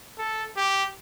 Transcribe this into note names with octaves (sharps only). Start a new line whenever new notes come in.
A4
G4